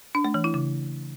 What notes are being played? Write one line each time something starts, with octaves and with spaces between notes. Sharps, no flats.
D4
A3
E3
E4
C#3